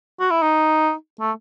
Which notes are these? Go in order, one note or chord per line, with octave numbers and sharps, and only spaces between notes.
F#4
E4
D#4
A3